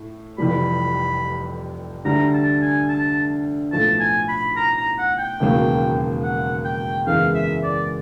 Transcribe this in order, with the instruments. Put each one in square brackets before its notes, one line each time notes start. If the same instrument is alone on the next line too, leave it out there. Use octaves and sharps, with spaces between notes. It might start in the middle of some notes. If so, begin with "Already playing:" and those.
Already playing: [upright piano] A2
[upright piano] F1 F2 C3 E3 G3 [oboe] B5
[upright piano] D2 D3 G3 [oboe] A#5
[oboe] A5
G#5
A5
[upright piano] B1 A2 F3 A3 [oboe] A5
[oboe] G#5
B5
A#5
A#5
F#5
G5
[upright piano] E1 D#2 C#3 F#3 A#3
[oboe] F#5
G5
[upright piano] F#1 E2 C#3 E3 G#3 [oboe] F5
[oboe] E5
D5